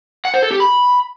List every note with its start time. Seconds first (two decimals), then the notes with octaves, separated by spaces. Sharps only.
0.25 F#5
0.34 C5
0.43 A4
0.51 G4
0.60 B5